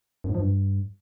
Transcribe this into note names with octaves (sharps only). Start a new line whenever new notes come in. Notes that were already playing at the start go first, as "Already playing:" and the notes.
F#2
G#2
F3
G2